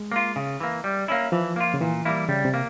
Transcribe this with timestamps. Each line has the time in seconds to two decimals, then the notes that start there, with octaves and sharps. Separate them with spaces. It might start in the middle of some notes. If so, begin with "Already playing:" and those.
Already playing: G#3
0.12 A#3 F4
0.36 C#3
0.60 E3 A#3
0.84 G3
1.08 A#3 C#4 E4
1.32 E3 F3
1.56 A#3 F4
1.74 C#3
1.81 A#2 E3
2.05 G3 A#3 E4
2.28 C#3 G3
2.45 C3
2.54 A#3